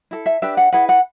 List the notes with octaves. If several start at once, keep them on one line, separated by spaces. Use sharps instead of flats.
E4 A4
E5
D4 G4 B4 E5
F#5
E4 G#4 B4 F#5
F#5